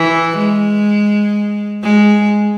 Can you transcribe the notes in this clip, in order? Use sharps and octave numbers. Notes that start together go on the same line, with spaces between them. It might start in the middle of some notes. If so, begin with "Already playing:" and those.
Already playing: E3
G#3
G#3